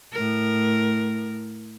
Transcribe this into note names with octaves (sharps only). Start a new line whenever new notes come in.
A2 A#4